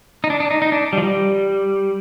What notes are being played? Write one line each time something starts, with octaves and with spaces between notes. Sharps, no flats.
D#4
D4
D4
D#4
D#4
D4
G3
F3
G3